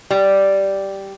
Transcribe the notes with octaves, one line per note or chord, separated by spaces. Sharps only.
G3